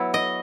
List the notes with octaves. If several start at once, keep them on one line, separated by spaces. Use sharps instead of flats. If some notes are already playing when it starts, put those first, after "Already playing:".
Already playing: F#3 B3 E4
D#5